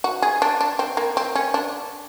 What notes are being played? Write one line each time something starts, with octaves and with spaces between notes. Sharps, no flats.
F#4
G#4
D4
D4
C4
A#3
C4
C#4
D4